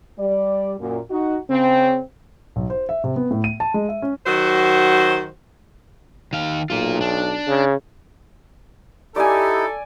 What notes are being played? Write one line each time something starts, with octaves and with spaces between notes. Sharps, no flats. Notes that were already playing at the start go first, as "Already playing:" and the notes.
G3 D5
F#2 A#2
D#4 F#4
C#3 C4
B1
C5
E5
C3
B3
A2
D#7
A5
G#3
E5
C#4
D#3 F#3 F#4 C5
D#3 F5
B1 A#3 F4
D4
C#3
D#4 E4 G4 A4 D5 G#5